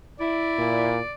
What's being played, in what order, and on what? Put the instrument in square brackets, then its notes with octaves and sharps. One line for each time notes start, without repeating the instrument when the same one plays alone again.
[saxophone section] E4 [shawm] D5
[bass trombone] A#2